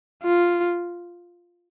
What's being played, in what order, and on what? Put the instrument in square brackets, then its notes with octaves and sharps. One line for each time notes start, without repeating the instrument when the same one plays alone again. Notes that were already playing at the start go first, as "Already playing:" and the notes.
[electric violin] F4